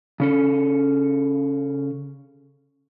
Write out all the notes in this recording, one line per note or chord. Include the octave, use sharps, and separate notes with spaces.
C#3 C#4 A4